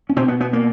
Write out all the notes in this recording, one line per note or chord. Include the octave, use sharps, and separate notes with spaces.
C#4
B2 C4
B3
B3
A#3